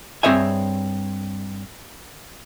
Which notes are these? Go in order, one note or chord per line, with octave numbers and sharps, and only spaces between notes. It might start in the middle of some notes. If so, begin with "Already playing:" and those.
G2 C4 G#4 C#5 E5 G#5